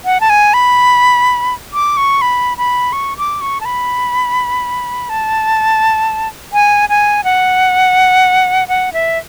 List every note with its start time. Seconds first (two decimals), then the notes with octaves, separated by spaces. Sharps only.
0.05 F#5
0.21 A5
0.30 G#5
0.54 B5
1.73 D6
1.97 C#6
2.22 B5
2.58 B5
2.93 C#6
3.18 D6
3.41 C#6
3.61 A5
3.65 B5
5.09 A5
6.53 G#5
6.89 G#5
7.24 F#5
8.68 F#5
8.93 E5